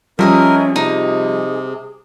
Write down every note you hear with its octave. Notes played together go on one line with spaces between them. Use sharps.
F3 G3 C#4 G#4 A#4 D#5 E5
C3 D#4 G#4